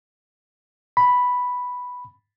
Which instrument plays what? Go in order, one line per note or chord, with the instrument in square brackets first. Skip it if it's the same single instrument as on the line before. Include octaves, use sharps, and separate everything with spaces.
[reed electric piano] B5